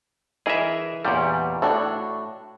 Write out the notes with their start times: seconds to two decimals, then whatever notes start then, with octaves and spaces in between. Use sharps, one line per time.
0.46 E3 G#4 A#4 D#5 E5
1.05 E2 A#2 G3 C#4 G5
1.62 A2 D4 F#4 A4